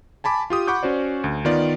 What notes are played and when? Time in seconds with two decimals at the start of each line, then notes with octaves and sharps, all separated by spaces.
0.24 G#5 A5 B5 D6
0.50 F4 G4 D#6
0.67 F#5 B5 C#6 D6 G6
0.83 C#4 F#4 C5 D5
1.24 D2
1.45 D#3 B3 F4 D5